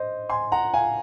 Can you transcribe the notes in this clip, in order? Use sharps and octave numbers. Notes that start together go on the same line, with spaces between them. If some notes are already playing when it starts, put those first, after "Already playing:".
Already playing: C5 D#5
G#5 C6
F#5 A#5
F5 G#5